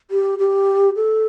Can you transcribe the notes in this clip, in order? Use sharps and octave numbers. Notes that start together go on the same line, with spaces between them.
G4
G4
A4